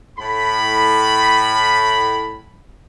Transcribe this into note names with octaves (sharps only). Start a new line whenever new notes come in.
A2 B5